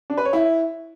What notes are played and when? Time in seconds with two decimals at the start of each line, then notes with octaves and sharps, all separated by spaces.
0.10 D4
0.17 B4
0.25 C#5
0.33 E4